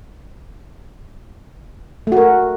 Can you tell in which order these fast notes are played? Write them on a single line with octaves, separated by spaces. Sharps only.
A3 F#4 A#4